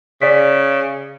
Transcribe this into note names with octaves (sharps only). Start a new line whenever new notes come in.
C#3 D5 B6